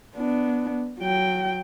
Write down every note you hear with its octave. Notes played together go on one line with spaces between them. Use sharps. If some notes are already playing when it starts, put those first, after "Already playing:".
B3 D4
F#3 G5